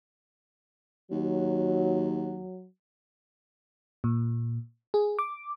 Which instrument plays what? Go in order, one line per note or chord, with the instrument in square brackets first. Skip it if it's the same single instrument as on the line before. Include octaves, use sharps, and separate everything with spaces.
[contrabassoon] D#2 [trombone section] F#3
[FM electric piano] A#2
G#4
D6